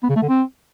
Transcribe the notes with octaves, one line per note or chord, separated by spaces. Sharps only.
B3
C#3
A3
D3
C4